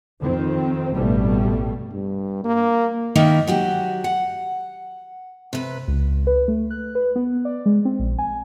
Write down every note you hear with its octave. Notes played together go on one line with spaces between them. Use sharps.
F2 D#3 C4
A1 G2 B2 G3 A3
G2
A#3
D#3 A#3 D#4 E4 E5
F#3 F#4 G4
F#5
C3 B4
C#2
B4
A3
F#6
B4
B3
D5
G#3
C4
A#1
G#5